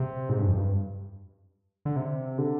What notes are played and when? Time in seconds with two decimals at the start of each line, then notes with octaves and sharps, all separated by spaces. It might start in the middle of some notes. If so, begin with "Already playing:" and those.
Already playing: C3
0.29 G#2
0.38 G2
0.48 F2
0.57 G2
1.85 D3
1.96 C3
2.38 D3